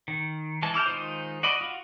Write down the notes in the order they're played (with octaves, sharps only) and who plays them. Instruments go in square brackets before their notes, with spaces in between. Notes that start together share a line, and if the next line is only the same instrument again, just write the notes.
[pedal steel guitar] D#3
E3 G#3 A5
E4 D6 F6 G6
D#3 G#3 D#4 F4 C5
F#4 D5 D#5 B5
F4 F#4